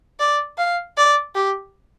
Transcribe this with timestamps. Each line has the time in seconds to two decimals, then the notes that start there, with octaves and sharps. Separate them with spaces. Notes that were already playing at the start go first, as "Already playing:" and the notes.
0.20 D5
0.58 F5
0.97 D5
1.35 G4